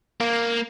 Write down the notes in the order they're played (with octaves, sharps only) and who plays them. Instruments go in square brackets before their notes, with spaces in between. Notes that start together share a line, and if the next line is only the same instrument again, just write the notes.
[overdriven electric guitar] A#3